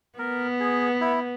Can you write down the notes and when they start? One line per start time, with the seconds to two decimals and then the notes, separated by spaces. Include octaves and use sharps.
0.19 B3 A#4
0.60 G#4
1.01 E4